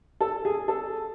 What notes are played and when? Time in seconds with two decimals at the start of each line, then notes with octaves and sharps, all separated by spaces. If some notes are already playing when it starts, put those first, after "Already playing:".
0.21 A4
0.45 G#4
0.68 A4